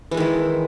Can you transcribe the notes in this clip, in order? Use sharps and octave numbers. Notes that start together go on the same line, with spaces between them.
D#3 E3 G#3 E4